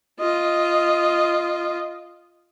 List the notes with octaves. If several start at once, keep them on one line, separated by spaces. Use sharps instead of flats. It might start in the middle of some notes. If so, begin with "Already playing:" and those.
F4 D#5